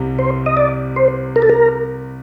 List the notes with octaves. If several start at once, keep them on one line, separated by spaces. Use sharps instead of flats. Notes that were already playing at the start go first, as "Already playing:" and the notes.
Already playing: C2 C3 G3
C5
D#5
D5
C5
A#4
A4
A#4